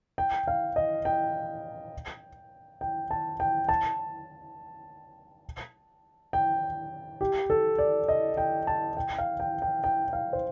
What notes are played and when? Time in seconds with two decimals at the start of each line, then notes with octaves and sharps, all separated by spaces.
0.18 G5
0.48 F5
0.76 D#5
1.05 G5
2.81 G5
3.11 A5
3.40 G5
3.69 A5
6.33 G5
7.21 G4
7.50 A4
7.78 D5
8.08 D#5
8.37 G5
8.67 A5
8.97 G5
9.18 F5
9.40 G5
9.62 G5
9.84 G5
10.13 F5
10.33 C5